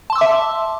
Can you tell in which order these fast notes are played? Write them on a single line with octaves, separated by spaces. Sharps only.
A5 C6 E6 D6 E5